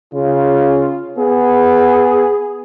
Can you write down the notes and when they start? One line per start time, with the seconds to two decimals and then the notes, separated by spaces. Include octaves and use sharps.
0.14 C#3 F4
1.18 B3 G#4